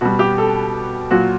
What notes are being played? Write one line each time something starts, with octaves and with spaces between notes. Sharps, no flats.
B2 G3 F#4
G4
A4
A#2 F#3 F#4